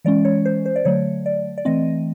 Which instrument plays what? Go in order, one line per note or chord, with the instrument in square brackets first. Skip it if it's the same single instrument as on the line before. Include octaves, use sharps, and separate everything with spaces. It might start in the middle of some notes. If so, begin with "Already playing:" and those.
[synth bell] E3 G#3 C#4 D5
C#5
C5
C5
D5
D3 F#3 A3 C#5
D5
D5
E3 A3 C4 D#5